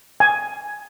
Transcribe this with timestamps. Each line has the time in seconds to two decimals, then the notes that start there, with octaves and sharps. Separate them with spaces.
0.20 G#5